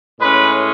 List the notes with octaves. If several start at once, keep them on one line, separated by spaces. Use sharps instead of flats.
A2 G#3 C#4 B4